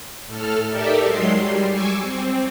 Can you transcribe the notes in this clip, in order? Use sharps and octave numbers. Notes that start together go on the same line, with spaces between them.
A2 A4 F6
D#4 G4 A4 A#4 D5 E5
F#3 G#3 C6 C7
G3
G#5 C#6 D6 E6
C4